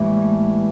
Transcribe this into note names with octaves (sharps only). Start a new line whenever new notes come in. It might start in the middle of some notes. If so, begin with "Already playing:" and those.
Already playing: A2 E3 G3 G#3 A#3
A3